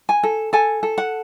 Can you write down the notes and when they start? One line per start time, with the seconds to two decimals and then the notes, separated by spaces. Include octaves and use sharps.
0.09 G#5
0.23 A4
0.53 A4 G#5
0.83 A4
0.98 F#5